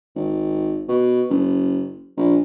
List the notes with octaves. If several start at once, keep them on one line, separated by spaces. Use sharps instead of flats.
G#1
B2
F#1
A#1